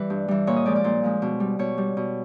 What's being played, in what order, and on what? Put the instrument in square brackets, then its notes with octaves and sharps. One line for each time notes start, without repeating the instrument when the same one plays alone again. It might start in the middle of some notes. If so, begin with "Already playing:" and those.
Already playing: [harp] E3 G3 B4
G2
E3 G3
A#2 C#5
D#5
F3 G#3 D5
D5
A#2 C5
F3 G#3
B2
G3
B2 C#5
G3
B2